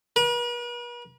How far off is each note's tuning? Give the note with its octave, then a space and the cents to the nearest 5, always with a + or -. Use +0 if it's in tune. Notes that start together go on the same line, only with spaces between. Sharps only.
B4 -45